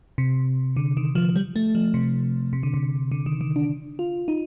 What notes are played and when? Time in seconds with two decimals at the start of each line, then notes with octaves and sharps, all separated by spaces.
0.18 C3
0.76 D3
0.97 D#3
1.15 F3
1.36 G3
1.56 A3
1.75 F3
1.94 C3
2.53 C3
2.63 D3
2.74 C3
3.12 D3
3.26 D#3
3.41 D#3
3.56 D4
3.99 F4
4.28 D#4